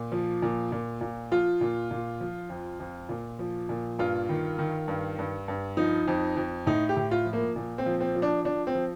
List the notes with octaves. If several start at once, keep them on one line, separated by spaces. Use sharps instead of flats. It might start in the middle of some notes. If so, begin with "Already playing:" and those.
Already playing: A#2
F3
A#2
A#2
A#2
F3 F4
A#2
A#2
F3
F2
F2
A#2
F3
A#2
G2 F4
D#3
D#3
G2
G2
G2
F3 D#4
F2
F2
A2 D#4
G4
A2
F4
F3
A#3
A#2
C4
F3
C4
F3
D4
F3 D4
C4
F3